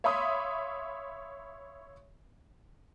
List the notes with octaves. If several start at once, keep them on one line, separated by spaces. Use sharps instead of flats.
C#5 E5 F5 B5 C6 D#6